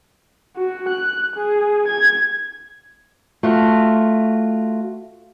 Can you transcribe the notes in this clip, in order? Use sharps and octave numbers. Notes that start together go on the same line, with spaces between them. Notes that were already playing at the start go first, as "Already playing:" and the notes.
F#4
F#6
G#4
G#6
A3 F4 F#4